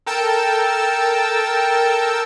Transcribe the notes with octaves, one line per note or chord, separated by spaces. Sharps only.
A4 A#4 G5 A5 E6